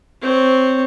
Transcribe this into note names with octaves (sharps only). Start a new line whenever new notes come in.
C4 C#5